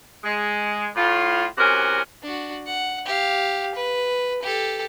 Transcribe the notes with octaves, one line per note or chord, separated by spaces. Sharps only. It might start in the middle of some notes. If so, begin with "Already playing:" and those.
G#3
A2 F4
E2 C3 C#4 F#4 A#4
D4 F#4
F#5
G4 F5
B4
G4 A4